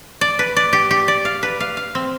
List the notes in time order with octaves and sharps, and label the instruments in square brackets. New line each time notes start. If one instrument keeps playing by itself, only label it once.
[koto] D5
B4
D5
G4
G4
D5
F5
B4
F5
F5
C4